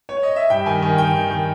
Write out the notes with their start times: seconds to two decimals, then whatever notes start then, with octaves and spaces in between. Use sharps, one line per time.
0.09 C#5
0.23 D#5
0.36 E5
0.50 G2 G5
0.66 D#3 G#5
0.82 D#3
0.98 D#3 G5
1.15 D#3
1.31 D#3